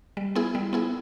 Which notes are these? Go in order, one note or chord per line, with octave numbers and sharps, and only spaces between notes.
G3
B3 E4 G#4
G3
B3 E4 G#4